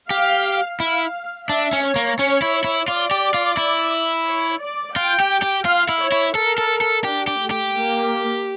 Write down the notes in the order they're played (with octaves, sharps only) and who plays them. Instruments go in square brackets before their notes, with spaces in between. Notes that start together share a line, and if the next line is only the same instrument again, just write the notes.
[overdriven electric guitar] G4 [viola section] F5
[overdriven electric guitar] E4 [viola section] F5
[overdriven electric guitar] D4 [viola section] E5
[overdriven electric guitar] C#4
[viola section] C#5
[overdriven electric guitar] A#3
[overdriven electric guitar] C#4 [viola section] C#5
[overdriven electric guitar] E4
E4
[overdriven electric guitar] F4 [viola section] D5
[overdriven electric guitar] G4
F4
E4
[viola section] C#5
D5
[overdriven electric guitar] F4 [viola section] G5
[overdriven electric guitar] G4
G4
[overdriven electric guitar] F4 [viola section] F5
[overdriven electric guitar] E4
[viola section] C#5
[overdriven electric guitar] E4
[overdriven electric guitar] A4 [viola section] A#4
[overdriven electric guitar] A4
A4
[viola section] D4 [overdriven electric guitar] G4
[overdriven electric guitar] G4
[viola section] A3
[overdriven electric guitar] G4
[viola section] A#3